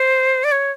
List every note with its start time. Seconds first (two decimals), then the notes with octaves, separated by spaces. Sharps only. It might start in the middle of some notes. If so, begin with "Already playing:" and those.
Already playing: C5
0.44 D5
0.52 C#5